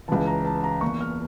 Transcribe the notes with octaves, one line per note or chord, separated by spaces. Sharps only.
C#2 C#3 E3 A5
A#5
A5
A#5
E2 E3 A#3 C#6
F6